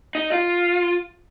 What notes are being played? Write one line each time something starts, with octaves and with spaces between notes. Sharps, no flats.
D#4
F4